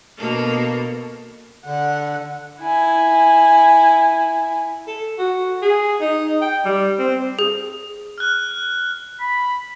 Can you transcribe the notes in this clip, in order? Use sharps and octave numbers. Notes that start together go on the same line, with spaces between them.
B2 A#3 D4 A4
D3 F#5
E4 G#5
A4
F#4
G#4
D#4
G5
G3
C4
G#4
F6 F#6
B5